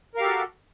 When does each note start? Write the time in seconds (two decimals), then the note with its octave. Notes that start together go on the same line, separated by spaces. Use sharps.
0.15 A#4
0.17 F5
0.20 G4
0.23 A4
0.26 F#4